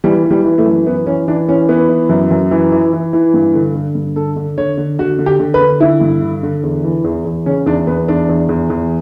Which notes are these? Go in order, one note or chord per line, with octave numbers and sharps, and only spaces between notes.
E3 G3
E3
G3
E3
A3
F#2
E3 B3
E3 C#4
E3 D4
E3 C#4
E3 B3
E3
F#2
F#2
E3
E3
E3
E3
G2
D3
D3
G2
D3 A4
D3
D3 C#5
D3
D3 F#4
D3
G4
D3
B4
D3
D3 E4
G2
D3
D3
E2
E3
E2
E2
C#3 C#4
E2 D4
E2 B3
E2 D4
E2
E2
E2